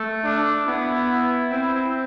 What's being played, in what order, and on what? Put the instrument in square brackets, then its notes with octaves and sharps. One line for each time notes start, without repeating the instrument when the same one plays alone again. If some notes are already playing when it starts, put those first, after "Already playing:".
Already playing: [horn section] A3
[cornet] D4
[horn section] B3 [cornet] E4
[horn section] C4